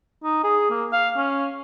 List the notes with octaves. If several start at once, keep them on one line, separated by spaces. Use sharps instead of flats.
D#4
G#4
A#3
F5
C#4